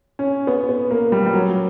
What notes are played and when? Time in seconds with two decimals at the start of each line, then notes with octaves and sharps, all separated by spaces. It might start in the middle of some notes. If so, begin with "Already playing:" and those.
0.19 C#4
0.47 B3
0.69 B3
0.91 A#3
1.12 G3
1.26 G3
1.33 F#3